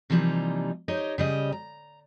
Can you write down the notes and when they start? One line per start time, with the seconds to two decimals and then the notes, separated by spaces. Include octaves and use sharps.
0.10 C3 E3 F3 G3 A#3 D#4
0.88 D#4 G4 C5 C#5 D#5
1.18 C#3 G3 D#5
1.52 A#5